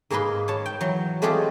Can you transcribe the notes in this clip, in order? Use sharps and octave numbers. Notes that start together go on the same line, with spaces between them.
G#2 A#3 G#4 A#4 B4 C6
C#5 A5
G5
E3 F#3
G#3 A3 C4 F4 G4 G#4